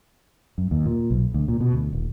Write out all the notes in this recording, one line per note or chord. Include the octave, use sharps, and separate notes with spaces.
F#2
D#2
A#2
B1
D2
A#2
B2
D2
D#1